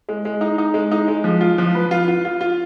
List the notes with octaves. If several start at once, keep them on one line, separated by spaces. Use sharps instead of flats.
G#3
G#3
D#4
D#4
G#3
D#4
G#3
F3
F4
F3
B4
F4
F4
F4
F4